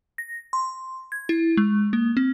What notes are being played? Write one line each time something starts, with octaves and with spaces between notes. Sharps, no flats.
A#6
C6
G#6
E4
G#3
A#3
C4